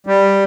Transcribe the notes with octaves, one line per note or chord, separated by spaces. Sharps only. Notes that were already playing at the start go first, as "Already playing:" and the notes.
G3